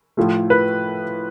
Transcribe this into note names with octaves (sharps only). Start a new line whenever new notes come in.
A2 F3 A3
B4